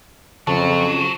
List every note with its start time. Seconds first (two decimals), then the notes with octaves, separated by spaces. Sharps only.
0.47 F2 C#3 F#3 A5